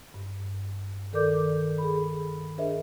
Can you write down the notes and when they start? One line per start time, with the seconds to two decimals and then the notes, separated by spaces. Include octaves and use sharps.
0.14 G2
1.13 D#3 A4 A#4 D5 D6 G6
1.78 G#4 B5
2.58 D4 G#4 A#4 C5 D#5 E5